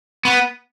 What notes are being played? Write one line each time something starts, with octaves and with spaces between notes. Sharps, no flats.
B3